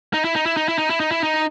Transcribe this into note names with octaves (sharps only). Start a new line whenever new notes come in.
D#4
E4
D#4
E4
D#4
E4
D#4
E4
D#4
E4
D#4